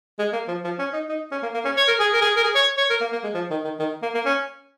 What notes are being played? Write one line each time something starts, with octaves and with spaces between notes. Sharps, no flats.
G#3
A#3
F3
F3
C#4
D#4
D#4
C#4
A#3
A#3
C#4
C#5
A#4
G#4
A#4
G#4
A#4
G#4
C#5
C#5
A#4
A#3
A#3
G#3
F3
D#3
D#3
D#3
A#3
A#3
C#4